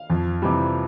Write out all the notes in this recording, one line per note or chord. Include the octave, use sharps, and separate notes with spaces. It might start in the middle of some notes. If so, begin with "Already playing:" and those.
Already playing: F5
F2
C3 E3 G3